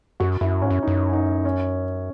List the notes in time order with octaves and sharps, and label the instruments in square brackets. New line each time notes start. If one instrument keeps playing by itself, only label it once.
[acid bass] F#2 [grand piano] F#4
[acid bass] F#2 [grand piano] E4
[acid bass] G#2 [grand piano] C#4
[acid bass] F#2
[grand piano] D#4
[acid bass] F#2
[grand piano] D#4
C#4